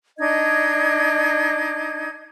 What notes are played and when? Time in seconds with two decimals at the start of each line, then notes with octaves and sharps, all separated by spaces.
0.18 D4 D#4 D#5 G#6